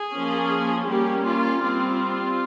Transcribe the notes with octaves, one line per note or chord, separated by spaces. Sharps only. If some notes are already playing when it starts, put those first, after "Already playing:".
Already playing: G#4
F3 A#3 C#4
G3 A#3 C#4 G4
F4
G3 C4 F4